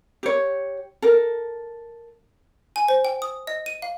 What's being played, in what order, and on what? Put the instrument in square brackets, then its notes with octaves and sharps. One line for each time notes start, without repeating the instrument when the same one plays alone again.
[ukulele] G4 C#5
A4 A#4
[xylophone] G#5
C5
G5
D#6
D#5
D#7
F5